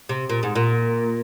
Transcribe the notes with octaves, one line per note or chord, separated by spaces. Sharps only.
C3
A#2
G#2
A#2